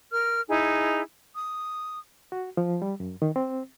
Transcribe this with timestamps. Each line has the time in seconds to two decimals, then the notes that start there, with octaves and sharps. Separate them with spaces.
0.11 A#4 F6
0.49 D#4 E4 G#4
1.34 D#6
2.32 F#4
2.57 F3
2.82 G3
3.00 F#2
3.22 D#3
3.36 C4